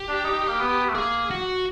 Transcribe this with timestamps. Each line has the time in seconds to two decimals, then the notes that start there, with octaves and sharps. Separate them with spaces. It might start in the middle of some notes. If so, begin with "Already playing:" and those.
Already playing: G4
0.09 D4
0.25 D#4
0.48 A#3
0.60 B3
0.89 A3
0.95 A#3 G#4
1.30 F#4